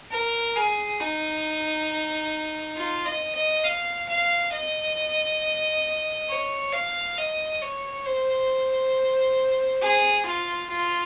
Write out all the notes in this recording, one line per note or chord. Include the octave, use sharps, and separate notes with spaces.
A#4
G#4
D#4
F4
D#5
D#5
F5
F5
D#5
C#5
F5
D#5
C#5
C5
G#4
F4
F4